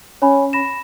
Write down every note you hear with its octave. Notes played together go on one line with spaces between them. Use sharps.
C#4 C#5 G#5 B5
B5 A#6 E7